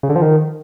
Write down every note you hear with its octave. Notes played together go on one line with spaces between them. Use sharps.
C#3
D3
F3
D#3